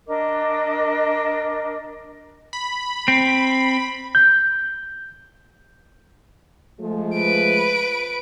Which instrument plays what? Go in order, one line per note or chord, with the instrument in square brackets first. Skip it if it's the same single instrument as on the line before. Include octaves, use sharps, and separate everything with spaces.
[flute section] D4 A#4 D#5 D6
[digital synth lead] B5
[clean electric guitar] C4
[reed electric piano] G6
[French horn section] F3 G#3 A3
[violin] B4 D7